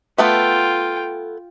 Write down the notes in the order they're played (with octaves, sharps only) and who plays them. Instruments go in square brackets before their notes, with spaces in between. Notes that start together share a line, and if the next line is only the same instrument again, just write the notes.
[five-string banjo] A3 B3 A4 [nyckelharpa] F4 G5